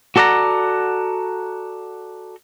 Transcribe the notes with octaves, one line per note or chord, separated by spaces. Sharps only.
F#4 A4 D5 F#5 A#5